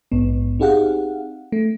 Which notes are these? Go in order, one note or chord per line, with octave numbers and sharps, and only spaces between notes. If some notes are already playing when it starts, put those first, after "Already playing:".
A#1 G#2 B3
C4 D#4 G4 G#4 F5 F#5
A3